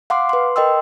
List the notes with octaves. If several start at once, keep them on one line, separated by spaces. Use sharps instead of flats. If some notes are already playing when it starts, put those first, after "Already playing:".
F5 F#5 C6 D6
B4 C6
A#4 D#5 G5 C6 E6